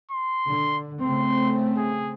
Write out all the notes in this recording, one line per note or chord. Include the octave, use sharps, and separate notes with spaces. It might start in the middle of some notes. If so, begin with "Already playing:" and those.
C6
D3
C#3 A3 C4 C6
G#4